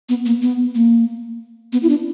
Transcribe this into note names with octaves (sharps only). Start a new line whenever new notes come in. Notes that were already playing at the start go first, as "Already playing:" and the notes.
B3
A#3
B3
A#3
B3
E4
D4